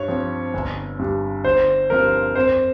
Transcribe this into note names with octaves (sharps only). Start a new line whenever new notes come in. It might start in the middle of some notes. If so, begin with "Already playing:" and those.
Already playing: G2 C#5
F3 C4
G1
G2 G3
G1 C5
G2 F3 C4 A#4
F2 C5